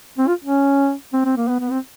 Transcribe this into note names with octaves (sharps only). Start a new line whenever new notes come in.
C4
F4
C#4
C4
C4
A#3
B3
B3
C4